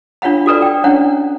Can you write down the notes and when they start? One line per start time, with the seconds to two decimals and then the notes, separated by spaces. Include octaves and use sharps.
0.22 D4 F4 C#5 F5 F#5 B5
0.46 F#4 A4 B4 D5
0.62 G5
0.84 C#4 D4 E4 C#5 F#5